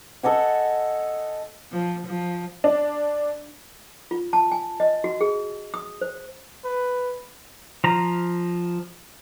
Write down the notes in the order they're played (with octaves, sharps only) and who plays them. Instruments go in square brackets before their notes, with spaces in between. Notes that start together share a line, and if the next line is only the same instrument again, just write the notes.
[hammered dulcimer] A4 D#5 F#5 G#5
[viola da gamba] F3
F3
[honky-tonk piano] D4
[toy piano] F4
A5
G#5
D#5
F#4
G#4
D#6
C5
[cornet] B4
[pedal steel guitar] F3 A#5